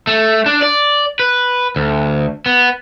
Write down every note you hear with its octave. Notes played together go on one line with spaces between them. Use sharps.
A3
D4
D5
B4
D2
B3